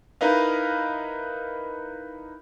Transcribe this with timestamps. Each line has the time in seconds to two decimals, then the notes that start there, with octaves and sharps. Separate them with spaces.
0.21 D#4 E4 A#4 B4 D#5 F5